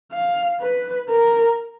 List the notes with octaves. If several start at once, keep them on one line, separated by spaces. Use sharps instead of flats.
F5
B4
A#4